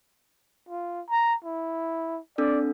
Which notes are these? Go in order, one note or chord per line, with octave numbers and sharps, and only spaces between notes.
F4
A#5
E4
C4 D4 A4 D5